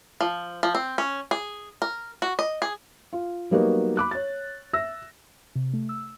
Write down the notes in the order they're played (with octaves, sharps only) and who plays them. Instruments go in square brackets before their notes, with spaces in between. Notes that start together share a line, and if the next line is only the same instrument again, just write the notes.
[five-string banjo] F3
F3
C4
C#4
G#4
A#4
F#4
D#5
G#4
[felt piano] F4
F#3 G3 A#3 B3 D#4 F#4
B5 D6 F#6
C#5 A6
E5 E6 A#6
[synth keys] C3
A3
E6